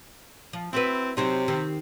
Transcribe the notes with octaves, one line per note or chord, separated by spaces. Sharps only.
F3
C4 E4 F#4 B4
C3 F#3 C4 D#4
D#3 C4 G4